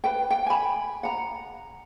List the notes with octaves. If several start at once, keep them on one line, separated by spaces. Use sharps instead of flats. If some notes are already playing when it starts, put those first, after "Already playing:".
B4 G5
G5
G#5 B5
F#5 A#5